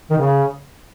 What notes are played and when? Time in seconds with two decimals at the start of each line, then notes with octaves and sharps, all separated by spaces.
0.11 D#3
0.18 C#3